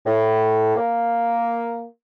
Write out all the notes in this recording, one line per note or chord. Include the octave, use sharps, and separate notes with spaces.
A2
A#3